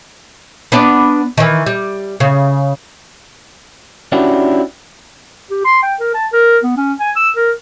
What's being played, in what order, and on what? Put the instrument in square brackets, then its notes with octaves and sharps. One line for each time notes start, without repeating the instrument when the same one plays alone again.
[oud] B3 D4 D5
D#3 E3
G3
C#3
[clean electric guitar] C#4 D4 E4 F#4 G4
[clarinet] G4
C6
G5
A#4
A5
A#4
B3
C#4
G#5
E6
A#4